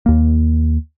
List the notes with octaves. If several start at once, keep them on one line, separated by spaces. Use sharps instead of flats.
D#2 A#3